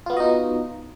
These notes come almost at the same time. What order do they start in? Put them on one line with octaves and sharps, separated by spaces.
F4 B3 F#4 D#5 D#4